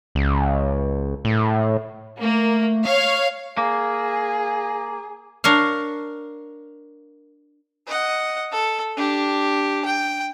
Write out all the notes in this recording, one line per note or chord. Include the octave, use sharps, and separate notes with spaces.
C#2
A2
A3 A#3
C#5 F5 C#6
A#3 G#4
D4 A#4 C#5 F5
D#5 F#5
A4
D4 G4
G5